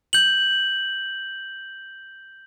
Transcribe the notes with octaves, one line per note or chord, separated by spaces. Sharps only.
G6 F#7